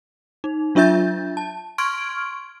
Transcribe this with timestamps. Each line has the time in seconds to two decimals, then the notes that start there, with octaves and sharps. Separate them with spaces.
0.44 D#4
0.75 F#3 D4 F4 E5 G6 A6
1.37 A5
1.78 C6 C#6 F6 G#6 D7